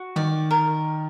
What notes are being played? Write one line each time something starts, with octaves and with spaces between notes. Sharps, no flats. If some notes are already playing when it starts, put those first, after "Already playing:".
Already playing: F#4
D#3 D5
A#4